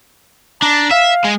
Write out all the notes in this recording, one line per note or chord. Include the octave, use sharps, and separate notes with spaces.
D4 A#5
E5 F5
G#3